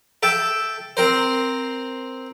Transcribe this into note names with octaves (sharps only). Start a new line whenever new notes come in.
A4 E5 G5 A5
C4 A#4 C5